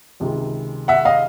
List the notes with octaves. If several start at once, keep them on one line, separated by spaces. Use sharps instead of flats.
C#2 C3 D#3 G#3
E5 F#5
D#5 F5